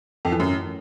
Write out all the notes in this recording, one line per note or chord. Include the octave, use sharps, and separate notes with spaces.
F2
E3
F#2